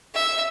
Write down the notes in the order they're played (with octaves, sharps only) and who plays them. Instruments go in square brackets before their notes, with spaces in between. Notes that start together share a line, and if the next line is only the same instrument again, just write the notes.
[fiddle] E5